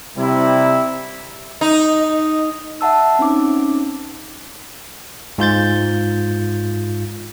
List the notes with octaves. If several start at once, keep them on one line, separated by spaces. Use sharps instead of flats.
C3 G3 E4
D#4 D#5
E5 F#5 A5 E6
C4 C#4 D#4 D6
G#2 F4 G6 A6